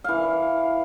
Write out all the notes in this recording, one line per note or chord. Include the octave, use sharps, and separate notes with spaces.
E3 F5